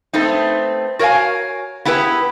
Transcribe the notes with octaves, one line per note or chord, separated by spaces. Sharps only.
A3 B3 C4 D#4
F#4 A#4 C#5 D#5 F5 G#5
B3 E4 G4 G#4 B4